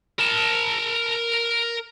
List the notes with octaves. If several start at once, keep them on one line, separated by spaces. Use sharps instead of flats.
A#4 A5